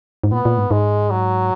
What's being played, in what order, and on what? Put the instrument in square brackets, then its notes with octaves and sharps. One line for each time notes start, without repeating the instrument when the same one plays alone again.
[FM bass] G#2
[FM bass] A#2 [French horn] B3
[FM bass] A#2
G#2
[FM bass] G#2 [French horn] G#3
[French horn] F#3